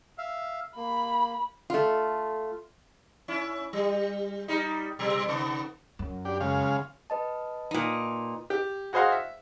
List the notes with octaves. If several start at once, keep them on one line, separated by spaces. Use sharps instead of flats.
E5 F5
A#3 B5
A3 F4
C#4 E4
G3
G3 D#4
B2 G3
C3 B3
F#2
D4 G4
C#3 G#3 F5
B4 D#5 A5
A#2 D#4
G4
F#4 G#4 C5 D#5 F5 F#5
E5